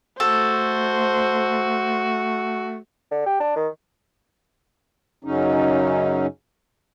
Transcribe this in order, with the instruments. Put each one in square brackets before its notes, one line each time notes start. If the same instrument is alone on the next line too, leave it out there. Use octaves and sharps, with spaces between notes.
[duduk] A3 [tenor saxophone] F#4 [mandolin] A4 [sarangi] C5
[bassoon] D3
G4
D4
D#3
[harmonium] F#2 C#3 F#3 C#4 D#4